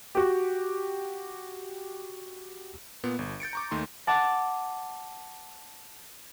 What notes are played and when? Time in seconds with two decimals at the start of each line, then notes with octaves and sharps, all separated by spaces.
0.15 F#4 G4
3.04 A#2 B3
3.19 G1
3.40 G6 A6 C#7 D7
3.53 A#5 C#6 D6
3.71 D#2 A3 D#4 C6
4.07 F#5 A5 D6 F#6